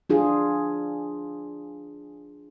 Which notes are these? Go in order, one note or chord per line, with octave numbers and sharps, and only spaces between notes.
D4 F4 G#4